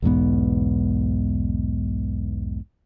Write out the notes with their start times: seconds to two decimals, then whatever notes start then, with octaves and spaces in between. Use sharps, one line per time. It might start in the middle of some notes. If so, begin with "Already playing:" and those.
0.02 B1 E2 G#2 B3